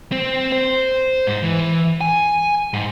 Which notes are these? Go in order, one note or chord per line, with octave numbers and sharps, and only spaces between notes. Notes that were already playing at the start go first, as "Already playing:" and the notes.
C4
C5
G#2
E3
G#5
G#2